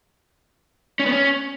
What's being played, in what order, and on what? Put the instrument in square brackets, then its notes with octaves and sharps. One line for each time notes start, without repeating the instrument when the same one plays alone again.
[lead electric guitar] C#4
B3
C#4